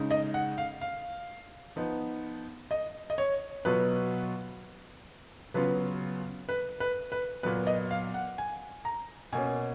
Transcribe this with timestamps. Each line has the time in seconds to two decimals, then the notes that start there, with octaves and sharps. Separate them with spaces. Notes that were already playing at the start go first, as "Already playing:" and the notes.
Already playing: C#3 G#3 D#4
0.11 D#5
0.34 F#5
0.58 F5
0.81 F5
1.76 F3 B3 D#4
2.71 D#5
3.10 D#5
3.18 C#5
3.65 B2 F#3 B3 F4 B4
5.54 C#3 F#3 B3 F4 B4
6.49 B4
6.80 B4
7.12 B4
7.43 A#2 F#3 B3 B4
7.67 D#5
7.91 F5
8.14 F#5
8.38 G#5
8.85 A#5
9.33 B2 A#3 C#4 G#5